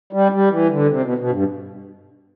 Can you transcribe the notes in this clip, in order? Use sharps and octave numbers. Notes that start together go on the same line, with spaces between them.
G3
G3
E3
D3
C3
B2
B2
G2